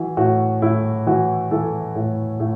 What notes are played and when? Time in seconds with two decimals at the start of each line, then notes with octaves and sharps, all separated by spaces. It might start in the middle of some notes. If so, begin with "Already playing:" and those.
Already playing: E3 F#4
0.17 A2 F#4
0.62 A2 E4
1.07 E3 F#4
1.51 E3 A4
1.95 A2
2.40 A2